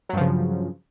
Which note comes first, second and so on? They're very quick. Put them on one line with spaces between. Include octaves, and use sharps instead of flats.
F#3 G2 F3 C#3